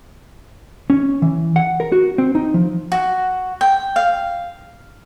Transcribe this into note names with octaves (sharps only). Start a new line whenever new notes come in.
C#4
E3
F#5
A#4
F#4
C4
D#4
F3
F#4
G5
F5